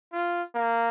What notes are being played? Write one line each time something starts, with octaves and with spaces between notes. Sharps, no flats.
F4
A#3